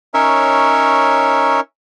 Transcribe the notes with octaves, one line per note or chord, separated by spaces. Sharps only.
C#4 D#4 A#4 C#5 E5